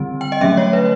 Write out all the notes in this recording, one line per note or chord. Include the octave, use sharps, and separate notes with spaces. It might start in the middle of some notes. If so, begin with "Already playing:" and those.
Already playing: D3 G3 C4
G5
D#5
D3 F#3 A3 C#4 E5
C#5
B4